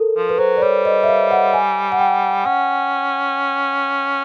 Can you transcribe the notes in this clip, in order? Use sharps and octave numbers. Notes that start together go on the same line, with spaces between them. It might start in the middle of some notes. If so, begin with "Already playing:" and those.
Already playing: A4 A#4
F3
B4
F#3 C5
D5
G3 C#5
D#5
E5
F5
F#5
G#5
F#5
G5
C#4 F#5